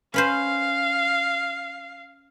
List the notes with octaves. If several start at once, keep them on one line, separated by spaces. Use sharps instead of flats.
C#4 B4 C5 F5